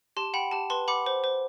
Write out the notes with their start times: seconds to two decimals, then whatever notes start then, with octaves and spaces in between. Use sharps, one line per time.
0.17 G4 A5 C6
0.34 F#5 G5 B5
0.51 G4 A5
0.70 B4 A5 C6
0.88 F#5 B5 D6
1.06 C5
1.24 C5